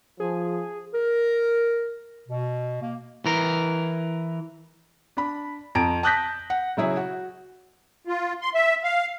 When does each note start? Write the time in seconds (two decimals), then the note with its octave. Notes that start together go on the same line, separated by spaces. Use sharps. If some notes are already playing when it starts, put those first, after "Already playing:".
0.20 F3 G#4
0.94 A#4
2.29 B2
2.82 A#3
3.26 E3 A#4
5.17 D4 B5
5.75 F2 A#5 D7
6.03 A5 D#6 F#6 G6 A#6 B6
6.50 F#5
6.77 C#3 F#3 E4 G#4
6.97 F#4
8.07 F4
8.41 C6
8.54 E5
8.84 F5